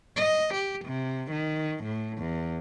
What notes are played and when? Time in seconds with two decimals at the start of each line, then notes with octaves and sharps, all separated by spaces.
0.16 D#5
0.54 G4
0.86 C3
1.32 D#3
1.84 A2
2.18 E2